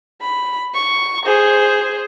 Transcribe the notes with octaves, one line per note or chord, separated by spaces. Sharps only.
B5
C#6
G#4 C5